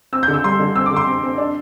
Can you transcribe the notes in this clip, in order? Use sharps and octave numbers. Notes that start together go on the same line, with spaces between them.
C4 E6
G6
D3
E6
G3 C6
D3
C4 E6
D6
D3
C6
C4
C4
D4